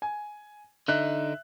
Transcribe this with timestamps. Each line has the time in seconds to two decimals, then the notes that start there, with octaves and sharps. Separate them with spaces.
0.02 G#5
0.88 D3 D#4 E5 F#6